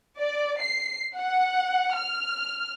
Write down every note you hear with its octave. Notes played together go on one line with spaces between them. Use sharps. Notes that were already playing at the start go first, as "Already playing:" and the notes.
D5
C7
F#5
F6